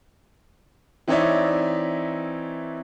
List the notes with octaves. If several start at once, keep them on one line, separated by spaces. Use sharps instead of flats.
E3 C4 D#4 C#5 D5 E5